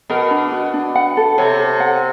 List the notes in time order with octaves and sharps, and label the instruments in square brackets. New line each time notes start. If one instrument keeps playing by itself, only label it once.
[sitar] B2 [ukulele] A#4
[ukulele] D4
F#4
D4
F#5
A4
[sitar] C3 [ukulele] C#5
[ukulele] A4
F#5